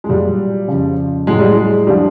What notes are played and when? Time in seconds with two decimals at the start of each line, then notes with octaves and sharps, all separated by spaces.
0.04 G#3
0.09 A#2 F#3 G3
0.68 F2 C#3 F3
1.27 A2 F#3 G#3
1.39 G3
1.52 G#3
1.87 D3 F3 G3